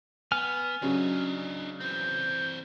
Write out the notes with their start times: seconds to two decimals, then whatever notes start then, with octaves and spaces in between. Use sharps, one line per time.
0.32 B3 G#5 F6
0.82 C#3 F#3 C#4 D4 D#5
1.81 E3 C4 G6